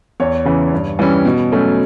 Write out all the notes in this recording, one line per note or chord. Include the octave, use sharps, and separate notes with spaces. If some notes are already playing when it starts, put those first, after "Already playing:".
E2 C#5
C#3 E3
G2
E3 G3 C#4
B2
F#3 A3 C#4